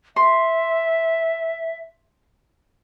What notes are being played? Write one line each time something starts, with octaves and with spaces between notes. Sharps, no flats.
E5 C6